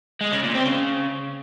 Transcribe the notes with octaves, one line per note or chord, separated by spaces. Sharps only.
G#3
C#3
A#2
C4
C#3